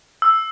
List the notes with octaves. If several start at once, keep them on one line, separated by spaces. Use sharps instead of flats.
E6